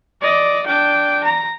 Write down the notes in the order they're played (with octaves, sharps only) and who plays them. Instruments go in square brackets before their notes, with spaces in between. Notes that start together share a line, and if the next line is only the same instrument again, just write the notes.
[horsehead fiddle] D5 D#5
D4 G5
A#5